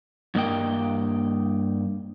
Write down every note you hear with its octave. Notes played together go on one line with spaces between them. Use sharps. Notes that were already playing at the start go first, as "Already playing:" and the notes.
G2 A#3 D#5 G5